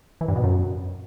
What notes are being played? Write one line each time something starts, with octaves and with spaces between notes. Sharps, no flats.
E3
G2
B2
F#2